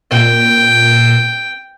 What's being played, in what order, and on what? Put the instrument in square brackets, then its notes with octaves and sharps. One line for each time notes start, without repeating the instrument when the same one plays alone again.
[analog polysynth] A#2 [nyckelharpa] G5